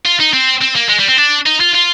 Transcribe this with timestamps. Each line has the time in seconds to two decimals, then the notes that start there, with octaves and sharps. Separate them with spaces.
0.05 F4
0.20 D#4
0.34 C4
0.62 C4
0.76 A#3
0.89 G#3
1.00 G3
1.09 C4
1.18 D4
1.46 D#4
1.60 F4
1.74 F4